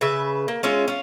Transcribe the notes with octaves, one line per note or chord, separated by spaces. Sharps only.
C#3 B4 E5
A#3
G#3 C#4 F4 E5
C#4 F4